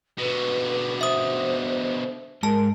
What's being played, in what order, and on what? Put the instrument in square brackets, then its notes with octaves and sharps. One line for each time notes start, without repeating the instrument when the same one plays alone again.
[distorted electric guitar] B2 D3 [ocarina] B4
[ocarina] C5 [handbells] E5 D#6
[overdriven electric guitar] G#2 [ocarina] A#4 [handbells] A5